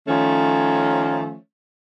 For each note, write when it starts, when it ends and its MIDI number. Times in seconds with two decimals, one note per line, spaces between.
0.07 1.36 51
0.07 1.36 53
0.07 1.36 57
0.07 1.36 61